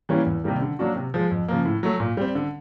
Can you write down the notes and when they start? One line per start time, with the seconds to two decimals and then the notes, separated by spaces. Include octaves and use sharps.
0.09 E3 G3 A#3 C#4
0.26 E2
0.44 C3 D#3 G3 A#3
0.62 D3
0.79 F#3 A#3 D4 F#4
0.96 C3
1.14 F3 G#3
1.31 F2
1.48 C#3 F3 A#3
1.65 A2
1.83 F#3 A3
2.00 A#2
2.17 G3 C4
2.35 D3